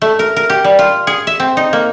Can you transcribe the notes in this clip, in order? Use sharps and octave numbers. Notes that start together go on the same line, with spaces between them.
A3
A#4
A#4
G4
G3
F4
G#4
E5
C4
D#4
A#3